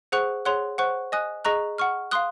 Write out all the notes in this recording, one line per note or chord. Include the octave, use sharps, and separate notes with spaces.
G#4 C5 F#5 C#6 F#6
G#4 C#5 F#5 C6 F#6
C5 F#5 C#6 F#6
D#5 G#5 D#6 F#6
G#4 D#5 A#5 C#6 F#6
F#5 C#6 F6
F5 C6 D#6 F#6